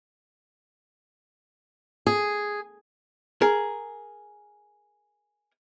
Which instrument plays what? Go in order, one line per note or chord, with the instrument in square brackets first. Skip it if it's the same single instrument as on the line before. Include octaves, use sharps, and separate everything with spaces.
[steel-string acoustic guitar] G#4
[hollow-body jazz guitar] G#4 A#4